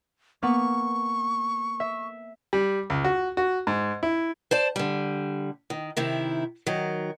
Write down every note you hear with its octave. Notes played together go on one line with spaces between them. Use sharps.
A#3 B3 C#6
E5
G3
C#2
F#4
F#4
G#2
E4
C5 D5 A5
D3 G3
D#3
C3 D#3 E4
D#3 F#3 A#4